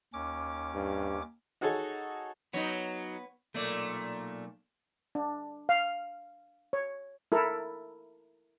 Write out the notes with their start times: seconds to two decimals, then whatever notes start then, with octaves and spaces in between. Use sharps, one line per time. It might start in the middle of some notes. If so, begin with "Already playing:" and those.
0.13 D#2 C#4 D6
0.74 G2
1.61 D#4 F#4 G#4 A4 C#5
2.53 F#3 B3 D#4 C#5
3.54 B1 A#2 A3 A#3 D5
5.15 D4
5.69 F5
6.73 C#5
7.32 E4 A4 A#4